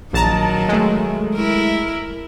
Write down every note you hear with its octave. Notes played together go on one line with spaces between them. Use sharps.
A#1 D#3 F#3 A5 A#5
G#3 A3
E4 A#4